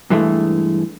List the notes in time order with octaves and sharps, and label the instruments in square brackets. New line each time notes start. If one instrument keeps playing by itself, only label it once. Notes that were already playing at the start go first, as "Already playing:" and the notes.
[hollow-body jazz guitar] G2 E3 G#3 A3